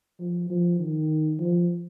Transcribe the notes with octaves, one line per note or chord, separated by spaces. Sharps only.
F3
F3
D#3
F3